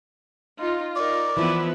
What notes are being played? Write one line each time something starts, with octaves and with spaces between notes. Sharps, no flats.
D#4 F4
D#4 A#4 D5
E3 F3 B3 E4 B4